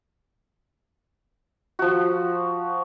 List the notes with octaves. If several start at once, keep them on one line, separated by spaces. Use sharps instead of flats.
F3 F#4